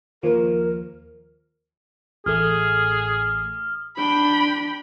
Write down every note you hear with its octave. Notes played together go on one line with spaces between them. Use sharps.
D#2 F3 A#4
A1 A3 G#4 D#6 F6
D4 G5 B5